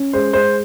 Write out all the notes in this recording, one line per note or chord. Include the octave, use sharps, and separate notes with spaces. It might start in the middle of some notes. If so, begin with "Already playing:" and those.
Already playing: C#4
G#3 C5
G#3 C5